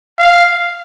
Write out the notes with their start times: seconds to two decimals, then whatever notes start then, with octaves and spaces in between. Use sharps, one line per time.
0.19 F5